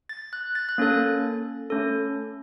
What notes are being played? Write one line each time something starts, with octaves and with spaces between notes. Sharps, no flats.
A6
F#6
A6
F#6
A#3 C#4 A4 A6
A3 C#4 A4